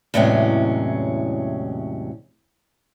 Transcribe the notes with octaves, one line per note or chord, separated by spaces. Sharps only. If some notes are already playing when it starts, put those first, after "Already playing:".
E2 A2 C3 F#3 G#3 C#4